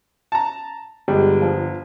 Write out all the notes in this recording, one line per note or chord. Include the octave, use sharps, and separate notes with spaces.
A5 A#5
G1 G3 G#3
F3